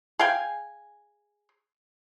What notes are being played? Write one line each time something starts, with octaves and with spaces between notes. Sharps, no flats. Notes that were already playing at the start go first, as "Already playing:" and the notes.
G#4 F5 G5 G#5